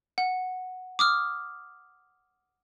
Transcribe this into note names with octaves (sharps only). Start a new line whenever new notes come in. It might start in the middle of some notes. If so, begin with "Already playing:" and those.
F#5
D6 D#6 F6